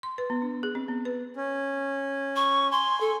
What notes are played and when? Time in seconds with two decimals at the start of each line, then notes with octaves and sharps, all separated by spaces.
0.03 C6
0.18 B4
0.30 B3
0.42 D4
0.63 G#4
0.75 C4
0.88 B3
1.05 B4
1.37 C#4
2.36 C#6
2.72 G#5 C6
3.01 A4